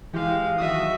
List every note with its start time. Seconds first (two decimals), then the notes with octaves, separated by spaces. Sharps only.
0.13 E3 G#3 G4 F5
0.58 D#3 F#3 F#4 E5 D#6